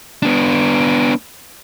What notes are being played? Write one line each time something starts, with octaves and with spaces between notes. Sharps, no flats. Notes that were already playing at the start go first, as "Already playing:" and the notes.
B3 D4